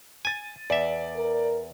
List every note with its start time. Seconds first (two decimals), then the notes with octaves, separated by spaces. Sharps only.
0.25 G#5 A6 D#7
0.70 E2 D5 E5
1.16 A#4